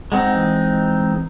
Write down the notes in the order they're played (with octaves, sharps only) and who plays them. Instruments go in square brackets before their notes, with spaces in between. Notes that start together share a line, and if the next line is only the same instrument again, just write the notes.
[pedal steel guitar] G#3 C4 D#4 [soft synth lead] F#5
[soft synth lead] E3